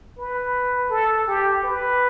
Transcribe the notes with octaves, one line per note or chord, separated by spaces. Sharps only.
B4
A4
G4
B4